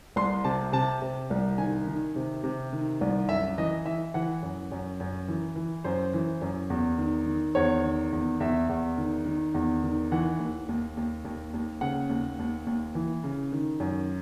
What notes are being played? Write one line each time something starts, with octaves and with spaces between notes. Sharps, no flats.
C2 C6
C3 A5
C3 A5
C3
C2
D#3 G#5
D#3
C3
C3
D#3
C2
F#2 E5
E3 D#5
E3 E5
E3 F#5
F#2
F#2
F#2
E3
E3
F#2 C5
E3
F#2
E2
D#3
D#3
E2 C#5
D#3
E2
E2 E5
E2
D#3
D#3
E2
D#3
E3 F#5
D#2
D#2
D#2
D#2
D#2
C#3 F#5
D#2
D#2
D#2
E3
C#3
D#3
F#2